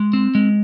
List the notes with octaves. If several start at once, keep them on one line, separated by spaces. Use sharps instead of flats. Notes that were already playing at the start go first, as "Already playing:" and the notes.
Already playing: G#3
C4
G#3